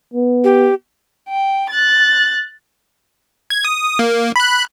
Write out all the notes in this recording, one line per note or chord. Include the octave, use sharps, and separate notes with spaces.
B3
G4
G5
F#6 A6
G#6
D#6
A#3
B5 F#6